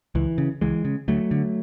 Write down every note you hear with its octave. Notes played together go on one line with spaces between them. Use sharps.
C#2 E3
C#3
C#2 E3 G#3
C#3
D2 F#3 A3
D3